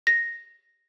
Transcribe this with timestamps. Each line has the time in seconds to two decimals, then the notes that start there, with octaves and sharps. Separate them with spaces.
0.07 A#6